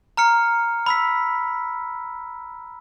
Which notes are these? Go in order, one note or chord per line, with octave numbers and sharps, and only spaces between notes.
A#5 F6 C#7
B5 E6 B6